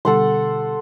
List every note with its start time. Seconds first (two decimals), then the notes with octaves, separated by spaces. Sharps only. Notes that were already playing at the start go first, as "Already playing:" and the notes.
0.05 B2 D3 G3 A4 F#5 C6